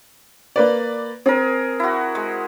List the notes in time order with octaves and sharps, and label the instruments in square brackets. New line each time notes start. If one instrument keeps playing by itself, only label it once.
[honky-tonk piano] A#3 B4 D5
[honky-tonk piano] C4 [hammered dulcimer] G#4 A#4
[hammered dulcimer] E4 F#4
G#3